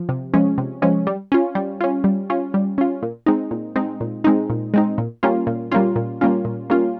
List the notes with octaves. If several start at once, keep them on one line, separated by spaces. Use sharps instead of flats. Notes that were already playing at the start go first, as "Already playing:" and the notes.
Already playing: F3
C3
F3 G#3 C#4
C3
F3 G#3 C#4
G3
C#4 F4
G3
C#4 F4
G3
C#4 F4
G3
C#4 F4
A#2
G#3 C4 D#4
A#2
G#3 C4 D#4
A#2
G#3 C4 D#4
A#2
G#3 C4 D#4
A#2
G3 A#3 C#4 F4
A#2
G3 A#3 C#4 F4
A#2
G3 A#3 C#4 F4
A#2
G3 A#3 C#4 F4